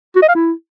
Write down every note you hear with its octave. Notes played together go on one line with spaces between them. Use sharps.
F#4
D#5
F5
E4